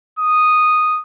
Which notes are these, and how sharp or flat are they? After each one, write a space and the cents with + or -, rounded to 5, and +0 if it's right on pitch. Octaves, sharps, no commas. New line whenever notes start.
D#6 -5